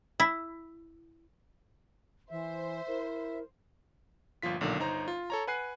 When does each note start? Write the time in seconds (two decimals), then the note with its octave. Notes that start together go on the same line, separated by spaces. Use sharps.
0.20 E4
2.31 E3 C5 E5
2.88 E4 A#4
4.42 G1 A#2 F3 F4 B6
4.61 B1 A#2 D3 D#3
4.80 G1 D#4 C5 A#5
5.08 F4
5.30 A4 C#5 A#5
5.47 B4 F#5 G#5 F#6 C7